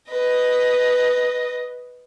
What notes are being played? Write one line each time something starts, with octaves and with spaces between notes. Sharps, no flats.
B4 D#5